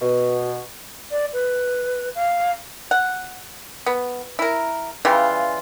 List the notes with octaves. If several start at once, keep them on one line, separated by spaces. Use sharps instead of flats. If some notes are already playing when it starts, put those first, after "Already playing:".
B2
D5
B4
F5
F#5
B3
E4 A#4
C#3 E3 G3 F4